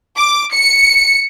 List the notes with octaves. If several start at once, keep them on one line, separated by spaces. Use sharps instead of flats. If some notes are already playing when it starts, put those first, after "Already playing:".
D6
C#7